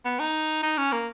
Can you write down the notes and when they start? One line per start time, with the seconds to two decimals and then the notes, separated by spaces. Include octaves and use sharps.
0.05 B3
0.19 D#4
0.63 D#4
0.78 C#4
0.92 A#3